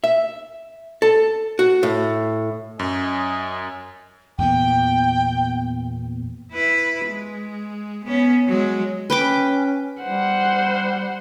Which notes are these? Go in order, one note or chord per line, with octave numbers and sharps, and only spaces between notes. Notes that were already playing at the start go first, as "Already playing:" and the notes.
E5
A4
F#4
A2
F#2 D#5 G#5
E2 A#2 B3 G5
E4 B4
G#3
B3 C#4
F#3 G#3
C#4 B4 G5 D6
G3 C5 F#5